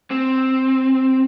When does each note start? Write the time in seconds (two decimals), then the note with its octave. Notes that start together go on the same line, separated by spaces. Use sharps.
0.11 C4